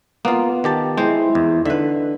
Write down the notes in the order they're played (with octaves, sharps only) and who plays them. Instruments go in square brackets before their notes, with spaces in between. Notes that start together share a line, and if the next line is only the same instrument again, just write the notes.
[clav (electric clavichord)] A#3 [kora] B3 F4
[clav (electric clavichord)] D#3 G4 A5
[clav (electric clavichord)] G#3 [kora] C4 C5 [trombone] E4
[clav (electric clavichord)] E2
[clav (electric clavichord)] D3 [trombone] D#4 [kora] B4 E5